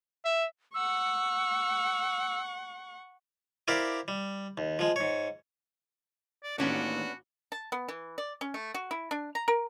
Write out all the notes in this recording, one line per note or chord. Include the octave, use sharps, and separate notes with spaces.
E5
F#5 C#6 E6
E4 G4 A#4 C5 D5 F5
G3
D#2
F3 G#3
G#2 C#5
D5
A1 D#2 B3 C#4 D4 F#4
A5
B3
E3
D5
C#4
A3
F#4
E4
D4
A#5
A#4